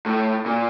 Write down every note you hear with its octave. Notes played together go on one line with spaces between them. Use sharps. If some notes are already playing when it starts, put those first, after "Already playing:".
A2
A#2